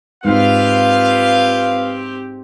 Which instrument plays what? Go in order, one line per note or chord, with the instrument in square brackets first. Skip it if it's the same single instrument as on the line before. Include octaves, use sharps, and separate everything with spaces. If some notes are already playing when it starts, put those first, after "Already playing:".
[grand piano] G#2 [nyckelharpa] C4 G4 [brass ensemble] F4 B4 F5